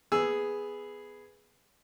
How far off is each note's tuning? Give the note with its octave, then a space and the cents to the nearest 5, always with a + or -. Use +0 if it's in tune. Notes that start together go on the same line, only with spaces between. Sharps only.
B3 +0 G#4 +0 E6 +0